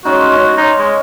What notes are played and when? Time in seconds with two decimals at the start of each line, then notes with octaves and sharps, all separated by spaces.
0.05 G#3 C#4 D#4 F#4
0.32 G#3 C#4
0.57 D#4 C#5
0.79 G#3